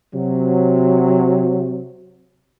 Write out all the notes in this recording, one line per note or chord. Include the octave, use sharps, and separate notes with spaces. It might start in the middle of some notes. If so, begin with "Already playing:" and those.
C3 F#3